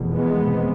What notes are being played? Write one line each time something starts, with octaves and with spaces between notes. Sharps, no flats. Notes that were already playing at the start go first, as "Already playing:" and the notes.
Already playing: F1 E2 B2
G#3 B3
C3